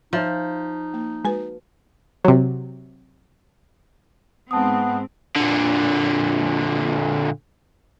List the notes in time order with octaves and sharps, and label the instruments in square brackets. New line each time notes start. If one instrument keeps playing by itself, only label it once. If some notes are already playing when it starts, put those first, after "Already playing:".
[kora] F3 [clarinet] D#4 [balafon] C#5 E5
[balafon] A#3
[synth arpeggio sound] G#3 G#5 [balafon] F#4 B4
[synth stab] C3 F#3
[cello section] G#2 C4 [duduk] B3 [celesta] A5 D#6
[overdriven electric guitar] A#2 D3